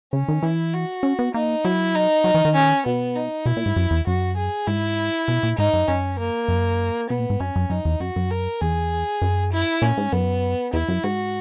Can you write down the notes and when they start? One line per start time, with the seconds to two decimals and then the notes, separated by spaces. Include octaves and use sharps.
0.13 C#3 C#4
0.28 D#3
0.43 E3 E4
0.73 F#4
1.03 C#4
1.19 B3
1.34 A#3 D#4
1.64 F#3 E4
1.95 D#4
2.24 F#3
2.35 E3
2.45 D#3
2.55 C#4
2.86 B2 B3
3.15 D#4
3.46 B2 E4
3.57 A#2
3.66 G#2
3.76 F#2
3.91 E2
4.07 F#2 F#4
4.37 G#4
4.67 G#2 E4
5.28 B2
5.43 A#2
5.58 G#2 D#4
5.73 F#2
5.88 F#2 C#4
6.19 A#3
6.48 F#2
7.10 B2 B3
7.19 A#2
7.30 G#2
7.40 F#2 C#4
7.56 F#2
7.70 F#2 D#4
7.85 E2
8.00 F#2 F#4
8.16 F#2
8.31 A#4
8.61 E2 G#4
9.22 F#2
9.52 E4
9.82 A#2 C#4
9.97 G#2
10.12 F#2 B3
10.73 E2 E4
10.88 F#2
11.04 G#2 F#4